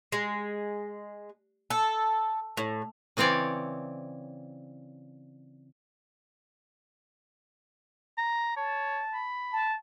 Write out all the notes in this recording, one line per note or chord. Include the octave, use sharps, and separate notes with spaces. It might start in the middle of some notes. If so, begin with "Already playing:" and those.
G#3
A4
A2
C#3 E3 C4 C#5 D5
A#5
C#5 A5
B5
A5